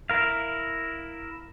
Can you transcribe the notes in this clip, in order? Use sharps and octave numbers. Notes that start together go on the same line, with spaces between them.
E4 A#4 F5